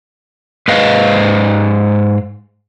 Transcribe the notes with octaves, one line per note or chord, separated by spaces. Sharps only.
G#2 B4 D#5 F5